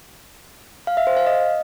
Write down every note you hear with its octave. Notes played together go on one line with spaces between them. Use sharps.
F5
E5
C5
F5
D#5